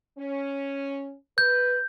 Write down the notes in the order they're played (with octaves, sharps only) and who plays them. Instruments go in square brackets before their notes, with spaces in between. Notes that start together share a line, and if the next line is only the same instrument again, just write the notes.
[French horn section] C#4
[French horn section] B4 [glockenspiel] G6